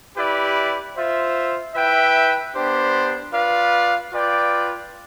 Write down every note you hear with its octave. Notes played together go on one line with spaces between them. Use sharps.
E4 G4 B4 D5
F4 C5 E5
E4 B4 E5 G5
B3 D4 G4 C5
F4 B4 D5 F5
F4 B4 D5 G5